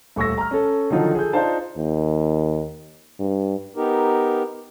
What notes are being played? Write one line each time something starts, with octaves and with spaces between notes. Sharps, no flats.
D#1 A3 C#6 E6 A#6
A#5 F6
C#4 A4
D3 D#3 F3 F#3 D#4 F4
G#4 A4 G6
D4 D#4 F4 C5 F5 A5
D#2
G2
B3 D#4 G4 A#4